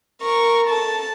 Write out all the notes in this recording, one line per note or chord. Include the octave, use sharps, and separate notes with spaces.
A#4 C#6
A4 A5